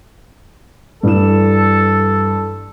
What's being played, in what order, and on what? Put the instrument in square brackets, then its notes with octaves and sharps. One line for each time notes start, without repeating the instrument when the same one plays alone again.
[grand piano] G2 E3 E7 [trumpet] A4